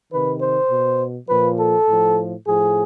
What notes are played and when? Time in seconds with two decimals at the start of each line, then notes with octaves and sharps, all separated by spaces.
0.12 C3 D#3 B4
0.42 C5
0.70 B2
1.29 A#2 F3 B4
1.59 A4
1.88 A2 F3
2.46 A2 F3 G#4